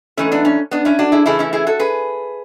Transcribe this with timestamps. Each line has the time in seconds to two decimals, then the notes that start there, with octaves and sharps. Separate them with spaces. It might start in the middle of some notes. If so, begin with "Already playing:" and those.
0.17 G#2 E3 A3 C#4
0.32 B3 D4
0.45 C#4
0.71 B3 D4
0.85 C#4 E4
0.99 D4 F#4
1.12 E4 G#4
1.26 C#3 E3 A3 E4 G#4
1.39 C#4 E4
1.53 E4 G#4
1.67 F#4 A4
1.79 G#4 B4